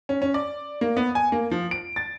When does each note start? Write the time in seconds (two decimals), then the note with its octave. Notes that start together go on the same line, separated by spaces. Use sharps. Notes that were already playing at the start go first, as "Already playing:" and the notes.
0.09 C#4
0.22 C#4
0.34 D5
0.81 A#3
0.97 B3
1.15 G#5
1.32 A#3
1.51 F3
1.71 D7
1.96 A6